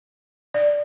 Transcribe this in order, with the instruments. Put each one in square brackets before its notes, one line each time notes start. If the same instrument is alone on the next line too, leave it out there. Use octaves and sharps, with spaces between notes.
[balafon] D5